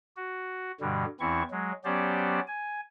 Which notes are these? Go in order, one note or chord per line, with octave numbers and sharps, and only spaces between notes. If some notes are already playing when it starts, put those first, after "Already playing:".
F#4
G2 B2 D3 G3
E2 E3 C4 E4 C#6
F#3 G#3
F#3 B3 C#4 G4 C5 D5
G#5